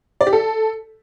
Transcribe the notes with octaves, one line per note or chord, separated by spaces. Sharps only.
D5
G4
A4